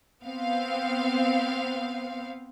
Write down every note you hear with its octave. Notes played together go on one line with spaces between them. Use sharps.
B3 C4 F5